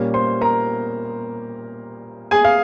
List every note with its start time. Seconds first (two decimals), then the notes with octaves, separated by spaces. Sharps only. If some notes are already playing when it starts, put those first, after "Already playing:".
Already playing: A#2 G3 A#3 C#4
0.14 C5 C6
0.41 A#4 A#5
2.31 G#4 G#5
2.45 F5